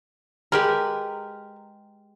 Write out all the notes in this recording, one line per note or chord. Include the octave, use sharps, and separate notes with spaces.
G#3 G4 A#4 B4